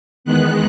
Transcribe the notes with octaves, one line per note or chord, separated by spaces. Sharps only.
E2 D#3 G#3 B3 F#6